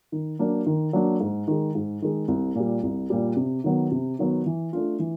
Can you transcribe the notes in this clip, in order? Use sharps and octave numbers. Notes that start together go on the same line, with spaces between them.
D#3
F#3 A#3 D4
D#3
F#3 A#3 D4
G#2
D#3 G#3
G#2
D#3 G#3
C2
A#2 G3
C2
A#2 G3
C3
D#3 F#3 B3
C3
D#3 F#3 B3
E3
A3 D4 F4
E3